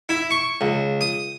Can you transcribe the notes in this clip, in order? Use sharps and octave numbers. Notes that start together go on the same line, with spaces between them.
E4
C#6
C#2
D#6